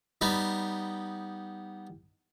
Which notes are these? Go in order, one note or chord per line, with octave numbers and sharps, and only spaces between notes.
G3 B3 D#4